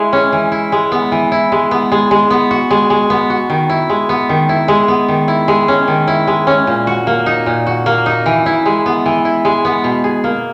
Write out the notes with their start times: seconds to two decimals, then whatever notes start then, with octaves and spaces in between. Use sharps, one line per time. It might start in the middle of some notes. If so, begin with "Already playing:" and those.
Already playing: G#3 E4
0.13 C#4
0.33 E3
0.52 E4
0.72 G#3
0.92 B3
1.12 E3
1.32 E4
1.52 G#3
1.71 B3
1.92 G#3
2.11 G#3
2.30 B3
2.51 F#4
2.71 G#3
2.90 G#3
3.10 B3
3.30 F#4
3.50 D#3
3.70 E4
3.89 G#3
4.09 B3
4.29 D#3
4.49 E4
4.68 G#3
4.88 B3
5.08 D#3
5.28 E4
5.48 G#3
5.68 C#4
5.88 D#3
6.08 E4
6.27 G#3
6.47 C#4
6.67 A#2
6.87 F#4
7.07 A#3
7.26 D#4
7.46 A#2
7.67 F#4
7.86 A#3
8.06 D#4
8.26 E3
8.46 E4
8.66 G#3
8.86 B3
9.06 E3
9.25 E4
9.45 G#3
9.65 B3
9.84 B2
10.04 G#4
10.24 A#3